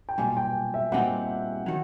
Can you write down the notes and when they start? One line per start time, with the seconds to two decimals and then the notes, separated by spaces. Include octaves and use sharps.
0.09 G5
0.18 B1 A#2 G3 G#5
0.37 G5
0.74 E5
0.92 A#2 G3 C4 D#4 G4 F#5
1.66 D#3 F#3